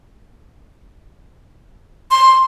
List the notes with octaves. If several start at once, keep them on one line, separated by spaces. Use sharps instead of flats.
C6